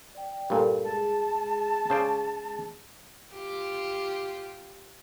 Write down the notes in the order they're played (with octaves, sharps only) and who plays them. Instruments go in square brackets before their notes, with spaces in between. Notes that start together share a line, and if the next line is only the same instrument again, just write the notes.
[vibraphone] D5 G5
[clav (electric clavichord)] G2 A#2 [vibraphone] G4 A4 A#4
[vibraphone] G#3 G#4 [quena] A5
[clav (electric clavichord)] C#3 C5 D5
[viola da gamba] F4 G4